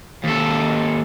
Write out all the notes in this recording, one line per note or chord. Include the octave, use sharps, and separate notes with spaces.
D#2 A4